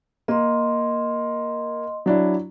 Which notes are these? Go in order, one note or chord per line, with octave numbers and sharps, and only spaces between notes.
A#3 D#5 C6
F#3 D4 E4